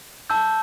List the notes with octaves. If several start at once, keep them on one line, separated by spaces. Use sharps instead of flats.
A5 E6 G6